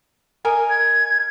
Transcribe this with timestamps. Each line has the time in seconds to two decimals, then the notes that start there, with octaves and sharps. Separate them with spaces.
0.45 A#4 D#5 G#5
0.70 G#6